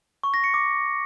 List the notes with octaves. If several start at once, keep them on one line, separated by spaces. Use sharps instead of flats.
C#6
A#6
C#7
D6